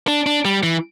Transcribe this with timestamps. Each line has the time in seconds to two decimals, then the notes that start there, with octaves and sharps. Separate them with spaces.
0.08 D4
0.26 D4
0.45 G3
0.63 E3